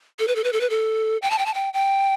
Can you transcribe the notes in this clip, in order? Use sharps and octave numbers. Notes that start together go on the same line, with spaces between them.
A4
B4
A4
B4
A4
B4
A4
G5
A5
G5
A5
G5
G5